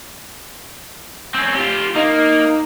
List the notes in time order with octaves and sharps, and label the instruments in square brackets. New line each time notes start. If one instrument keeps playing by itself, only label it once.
[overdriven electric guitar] C4 C#4
F4 G4
[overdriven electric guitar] A#3 [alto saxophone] D#4